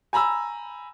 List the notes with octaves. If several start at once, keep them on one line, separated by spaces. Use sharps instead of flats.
G#5 A#5 B5 E6